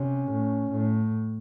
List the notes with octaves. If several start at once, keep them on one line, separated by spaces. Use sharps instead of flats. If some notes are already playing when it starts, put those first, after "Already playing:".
Already playing: C3 C#4
A2
A2